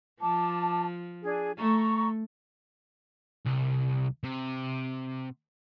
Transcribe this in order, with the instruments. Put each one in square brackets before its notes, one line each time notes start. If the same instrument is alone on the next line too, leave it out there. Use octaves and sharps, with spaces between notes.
[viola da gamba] F3 [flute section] A5 D6
[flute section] D4 G#4
[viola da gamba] A3 [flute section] A#5 C#6
[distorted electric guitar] C2
C3